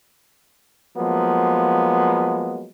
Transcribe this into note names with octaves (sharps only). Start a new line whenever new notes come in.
F3 F#3 G#3 A#3 B3